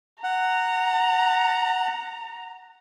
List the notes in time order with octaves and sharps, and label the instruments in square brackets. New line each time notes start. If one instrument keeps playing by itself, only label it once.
[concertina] F#5 [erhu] A#5